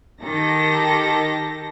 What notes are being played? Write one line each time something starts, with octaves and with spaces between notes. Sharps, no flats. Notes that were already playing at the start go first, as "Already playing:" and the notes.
D#3 G4 A4 A#6